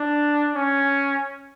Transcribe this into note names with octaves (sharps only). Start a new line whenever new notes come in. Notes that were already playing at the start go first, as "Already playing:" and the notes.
Already playing: D4
C#4